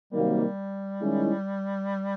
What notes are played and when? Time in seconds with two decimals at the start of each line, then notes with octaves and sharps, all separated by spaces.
0.12 C3 D#3 F#3 G3 A#3
1.01 D#3 G#3 C#4 E4